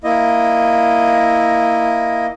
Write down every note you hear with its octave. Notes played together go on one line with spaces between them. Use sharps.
A#3 E4 D#5